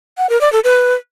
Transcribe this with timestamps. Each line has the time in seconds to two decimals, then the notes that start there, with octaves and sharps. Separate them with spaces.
0.18 F#5
0.30 A#4
0.41 D5
0.53 A4
0.64 B4